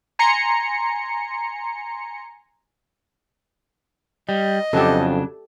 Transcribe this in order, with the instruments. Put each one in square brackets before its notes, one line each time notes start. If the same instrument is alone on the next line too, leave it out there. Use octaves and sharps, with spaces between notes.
[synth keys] G#5 A#5 C6 C#7
[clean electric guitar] G3 [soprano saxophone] D#5
[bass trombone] F2 [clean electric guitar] C#3 F#3 D4 [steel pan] G4 A4